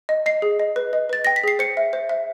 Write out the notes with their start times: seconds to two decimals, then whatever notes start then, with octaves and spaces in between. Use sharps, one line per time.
0.09 D#5
0.26 D#5 C7
0.42 G#4
0.59 D#5
0.76 B4
0.93 D#5
1.09 B4 A6
1.25 G5 A#6
1.36 B6
1.44 G#4 C7
1.59 C5 C#7
1.77 E5
1.93 C5
2.09 E5